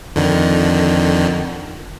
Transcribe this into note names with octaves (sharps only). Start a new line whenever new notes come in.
F2 D3 D#3